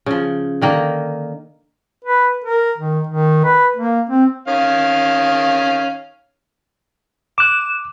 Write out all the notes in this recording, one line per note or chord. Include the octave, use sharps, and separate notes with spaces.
C#3 F3
D3 D#3 A#3
B4
A#4
D#3
D#3
B4
A#3
C4
D#3 C#4 F5
D6 F#6 E7